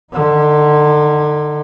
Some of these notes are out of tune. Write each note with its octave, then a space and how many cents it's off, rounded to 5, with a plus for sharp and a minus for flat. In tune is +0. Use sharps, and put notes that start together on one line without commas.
D3 +30 D#4 +0